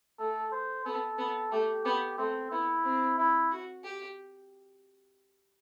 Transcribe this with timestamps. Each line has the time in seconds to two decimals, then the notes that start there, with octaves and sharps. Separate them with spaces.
0.19 A3 A4
0.52 C5
0.85 B3 A4
1.18 B3
1.51 A3 G4
1.85 B3 G4
2.18 A3 C4
2.51 B3 E4
2.84 C4
3.18 E4
3.51 F#4
3.84 G4